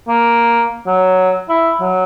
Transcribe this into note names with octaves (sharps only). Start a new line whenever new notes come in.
A#3
F#3
E4
F#3